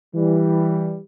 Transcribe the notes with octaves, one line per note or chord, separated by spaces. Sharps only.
E3 G3